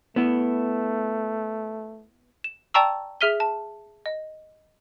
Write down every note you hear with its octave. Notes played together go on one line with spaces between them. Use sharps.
A3 B3 E4
E7
D5 G5 A5 A#5 C#6 E6
G#4 E5 F6 B6 D#7 G7
A5
D#5